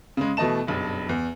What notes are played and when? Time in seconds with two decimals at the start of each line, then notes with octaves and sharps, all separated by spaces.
0.17 C#3 G#3
0.37 B2 E3 A3 D#5 A5 E7
0.67 F#1 B1 G2
1.09 E2